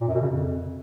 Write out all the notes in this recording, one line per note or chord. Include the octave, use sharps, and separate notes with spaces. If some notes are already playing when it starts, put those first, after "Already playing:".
A#2
F#2
B2
C#3
F2